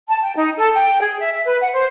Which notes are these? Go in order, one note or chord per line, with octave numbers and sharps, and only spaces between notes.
A5
G5
D#4
A4
G5
G#4
E5
E5
B4
F#5
C5